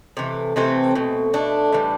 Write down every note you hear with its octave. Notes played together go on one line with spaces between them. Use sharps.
C3 E3 A3
C3 E3 A3 C4
B2 A3
B2 A3 D4
A2 E3 G3